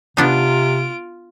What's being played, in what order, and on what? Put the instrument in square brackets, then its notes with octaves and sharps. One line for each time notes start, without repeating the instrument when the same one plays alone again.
[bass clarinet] C3 [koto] B3 D4 D#4 [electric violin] F4 D7